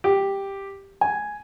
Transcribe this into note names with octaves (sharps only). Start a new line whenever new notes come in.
G4
G#5